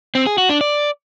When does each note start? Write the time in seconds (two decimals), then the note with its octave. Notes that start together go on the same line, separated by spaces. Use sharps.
0.15 C4
0.26 G#4
0.38 F#4
0.49 D4
0.61 D5